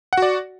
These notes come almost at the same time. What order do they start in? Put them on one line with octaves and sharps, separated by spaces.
F#5 F#4 D5